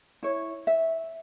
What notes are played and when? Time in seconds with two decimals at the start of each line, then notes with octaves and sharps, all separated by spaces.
0.23 E4 C#5
0.67 E5